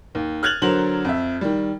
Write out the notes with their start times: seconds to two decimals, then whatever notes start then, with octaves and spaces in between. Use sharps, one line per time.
0.15 D#2
0.43 F6 F#6 G#6 A6 F7 F#7
0.62 D3 F#3 A#4 C5 F#7
1.05 F2 E5
1.41 D#3 G3